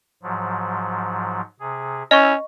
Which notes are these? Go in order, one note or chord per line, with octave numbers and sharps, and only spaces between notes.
G#2 F3 F#3
C3 G#4
C#4 E4 D#5 C#6